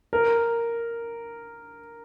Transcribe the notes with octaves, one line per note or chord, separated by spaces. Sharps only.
A#4